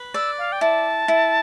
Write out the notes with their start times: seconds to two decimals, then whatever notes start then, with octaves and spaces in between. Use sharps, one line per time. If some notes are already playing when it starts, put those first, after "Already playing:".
Already playing: B4
0.14 D5 E6
0.38 F5
0.52 G5
0.61 E4 A5
1.08 E4